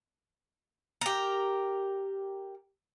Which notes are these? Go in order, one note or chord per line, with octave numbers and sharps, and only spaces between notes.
G4 A#4